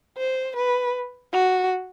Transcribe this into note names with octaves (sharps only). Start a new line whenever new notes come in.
C5
B4
F#4